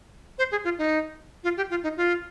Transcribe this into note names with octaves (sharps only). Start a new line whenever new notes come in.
C5
G#4
F4
D#4
F4
G4
F4
D#4
F4